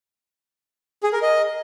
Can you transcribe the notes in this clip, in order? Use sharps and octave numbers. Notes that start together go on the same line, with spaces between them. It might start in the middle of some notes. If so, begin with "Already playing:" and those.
G#4
A#4
D#5